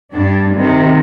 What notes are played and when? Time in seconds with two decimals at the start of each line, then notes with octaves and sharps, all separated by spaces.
0.14 G2 D4
0.56 C3 D#3